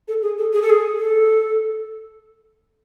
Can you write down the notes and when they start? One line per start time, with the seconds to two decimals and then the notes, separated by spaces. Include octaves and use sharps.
0.08 A4
0.22 G#4
0.38 A4
0.53 G#4
0.62 A4
0.69 G#4
0.98 A4